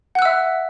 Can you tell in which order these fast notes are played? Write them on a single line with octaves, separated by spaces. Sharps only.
F#5 F#6 E6 E5